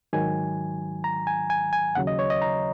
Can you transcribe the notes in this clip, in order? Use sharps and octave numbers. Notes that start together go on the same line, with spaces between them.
G#2 D#3 F#3 G#5
A#5
G#5
G#5
G#5
D#2 C#3 F#3 F#5
D#5
C#5
D#5
A#5